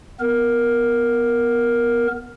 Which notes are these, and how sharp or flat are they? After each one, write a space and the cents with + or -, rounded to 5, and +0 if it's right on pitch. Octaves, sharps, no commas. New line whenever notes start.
B3 +0 A#4 +5